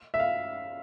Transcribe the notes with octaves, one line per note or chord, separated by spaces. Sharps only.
E5
F5